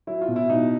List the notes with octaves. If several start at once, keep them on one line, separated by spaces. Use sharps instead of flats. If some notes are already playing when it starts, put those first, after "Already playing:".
F#3 E4
F4
B2
E4
B2 D#4